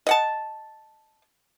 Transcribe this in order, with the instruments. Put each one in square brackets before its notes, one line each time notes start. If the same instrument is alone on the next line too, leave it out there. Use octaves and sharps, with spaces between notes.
[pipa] D#5 F#5 A5